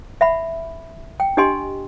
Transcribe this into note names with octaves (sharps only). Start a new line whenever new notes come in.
E5 F#5 B5
G5
D4 G4 D#5 G#5 C6